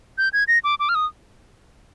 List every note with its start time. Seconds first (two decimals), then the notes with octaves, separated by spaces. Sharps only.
0.18 G6
0.33 G#6
0.48 A#6
0.64 D6
0.80 D6
0.89 F6
0.95 D#6